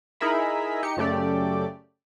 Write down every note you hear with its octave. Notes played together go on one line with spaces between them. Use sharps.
D#4 E4 G#4 A#4 E5 B5
D#4 G4 C#7
F#2 C#3 A3 G4 D5